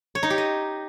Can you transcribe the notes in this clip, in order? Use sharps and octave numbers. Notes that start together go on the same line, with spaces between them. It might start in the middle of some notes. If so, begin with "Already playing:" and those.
C#5
D#4
G4
D#5